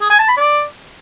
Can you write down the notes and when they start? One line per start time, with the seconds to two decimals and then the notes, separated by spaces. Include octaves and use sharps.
0.01 G#4
0.10 G#5
0.19 A5
0.28 B5
0.37 D5